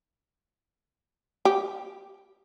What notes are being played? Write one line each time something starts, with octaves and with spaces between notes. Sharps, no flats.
G4